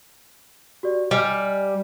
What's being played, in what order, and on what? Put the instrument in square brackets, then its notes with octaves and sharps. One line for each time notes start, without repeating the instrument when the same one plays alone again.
[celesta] F#4 G4 D5
[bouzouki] G3 [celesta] D#5 G#5 F6